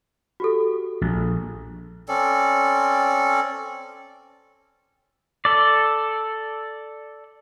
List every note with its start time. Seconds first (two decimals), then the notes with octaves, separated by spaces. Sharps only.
0.40 F#4 G4 A4
1.01 A#1
2.08 C4 C#4 A4 D5
5.45 A4 D5